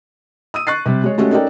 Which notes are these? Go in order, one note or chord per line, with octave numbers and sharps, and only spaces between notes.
D#6 E6 D#7
C#6 F#6 A6 C7
C3 G3
G#3 C#5
G#3 A3 C#4 F#4 G4
C#4 D#4 A4 A#4 D5 G5